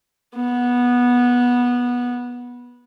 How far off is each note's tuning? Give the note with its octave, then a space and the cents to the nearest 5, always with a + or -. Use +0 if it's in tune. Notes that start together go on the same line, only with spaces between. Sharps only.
B3 -15